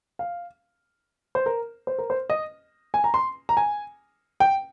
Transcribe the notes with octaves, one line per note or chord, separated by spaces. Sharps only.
F5
C5
A#4
C5
A#4
C5
D#5
G#5
A#5
C6
A#5
G#5
G5